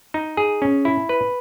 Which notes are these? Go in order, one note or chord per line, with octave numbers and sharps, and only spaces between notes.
D#4
G#4
C#4
E4
B4